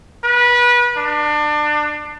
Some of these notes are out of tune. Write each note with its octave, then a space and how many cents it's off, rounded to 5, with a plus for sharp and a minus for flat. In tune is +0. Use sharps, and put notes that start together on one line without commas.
B4 -25
D4 +30